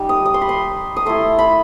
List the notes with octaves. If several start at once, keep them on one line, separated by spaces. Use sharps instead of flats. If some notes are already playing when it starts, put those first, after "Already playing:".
Already playing: G3 D#4
D#6
D#6
C6
B5
C6
D#6
A3 E4 C6
B5